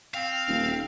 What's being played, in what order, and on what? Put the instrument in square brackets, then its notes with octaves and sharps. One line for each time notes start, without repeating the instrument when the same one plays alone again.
[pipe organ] C4 [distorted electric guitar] F5
[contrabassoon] D#1